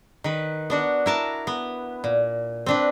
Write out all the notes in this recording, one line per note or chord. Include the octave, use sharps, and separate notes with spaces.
D#3 B4
B3 D4 F#4
E4 A#4 A5
B3
A#2
C4 D4 B4